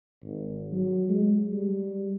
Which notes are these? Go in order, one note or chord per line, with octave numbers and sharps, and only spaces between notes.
G#1
F#3
G#3
G3